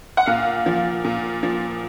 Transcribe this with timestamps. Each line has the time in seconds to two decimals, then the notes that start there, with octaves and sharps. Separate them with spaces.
0.17 F#5
0.26 A#2 F5
0.66 F3
1.04 A#2
1.43 F3